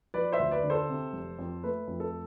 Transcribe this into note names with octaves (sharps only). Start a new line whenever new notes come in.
F3 B4 D5
C5 E5
D2
B4 D5
D3
A4 C5
C3
F1
F2
A3 B4
F2
A4